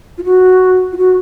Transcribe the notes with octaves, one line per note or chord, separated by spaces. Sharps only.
F4
F#4
F4
F#4